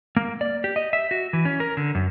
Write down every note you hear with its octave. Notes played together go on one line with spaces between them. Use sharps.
A#3
D5
G4
D#5
E5
F#4
E3
C#4
A#4
D3
F#2